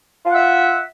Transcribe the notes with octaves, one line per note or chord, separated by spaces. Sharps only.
F4 E5 F#5